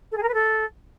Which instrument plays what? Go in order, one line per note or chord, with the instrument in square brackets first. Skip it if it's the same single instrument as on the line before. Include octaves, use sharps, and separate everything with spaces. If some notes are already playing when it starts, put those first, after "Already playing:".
[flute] A4
G#4
A#4
B4
A4